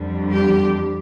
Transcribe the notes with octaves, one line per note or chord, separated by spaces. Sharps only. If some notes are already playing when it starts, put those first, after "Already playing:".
Already playing: F2 D3 G3
G4